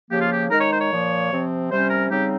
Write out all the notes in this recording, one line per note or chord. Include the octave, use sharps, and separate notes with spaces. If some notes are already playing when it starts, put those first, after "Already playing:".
C#3 F3 A#3 G4
F4
G4
D#3 G#3 D#4 A#4
C#5
C5
C#5
A#2 F3 A#3
C3 F3 C4
C3 G3 C#4 C5
A#4
C#3 G3 C4 D#4 G4